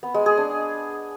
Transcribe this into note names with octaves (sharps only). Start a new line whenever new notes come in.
B3
G#3
G#4
D4